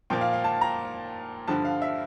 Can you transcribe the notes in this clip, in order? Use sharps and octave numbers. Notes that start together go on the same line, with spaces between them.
A#2 F3 A#3 G5
F5
F5
A5
A#5
G2 D3 F3 A5
F5
E5